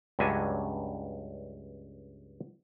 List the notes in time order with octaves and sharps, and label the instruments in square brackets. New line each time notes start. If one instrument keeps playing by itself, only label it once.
[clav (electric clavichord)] C#2 G2 F#3 C#4 D4 G#5